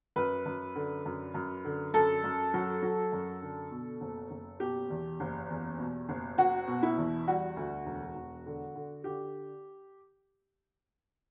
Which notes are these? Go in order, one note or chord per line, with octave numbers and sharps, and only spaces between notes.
F#2 B4
F#2
D3
F#2
F#2
D3
F#2 A4
F#2
F#3
F#3
F#2
D3
B2
F#1
F#1
B2 G4
E2
F#1
E2
B2
F#1
F#1 F#4
B2
E4
E2
G3 F#4
D2
E1
E1
D3
D3
D3 G4